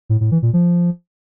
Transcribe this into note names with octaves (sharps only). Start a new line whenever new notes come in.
A2
A2
E3
A#2
F3